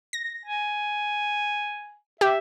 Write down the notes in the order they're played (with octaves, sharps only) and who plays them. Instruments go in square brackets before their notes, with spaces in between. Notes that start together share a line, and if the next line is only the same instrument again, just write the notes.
[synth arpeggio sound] A#6
[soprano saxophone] G#5
[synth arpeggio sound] G4 [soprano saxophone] E5